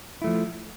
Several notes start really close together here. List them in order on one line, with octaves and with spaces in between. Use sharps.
E4 A3 F3